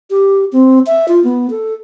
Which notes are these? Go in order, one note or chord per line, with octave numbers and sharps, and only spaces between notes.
G4
C4
E5
F4
B3
A4